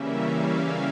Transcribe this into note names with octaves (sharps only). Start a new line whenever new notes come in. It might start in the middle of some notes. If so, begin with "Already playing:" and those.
Already playing: C#3 E3 G3 A#3 C#4 E5
F5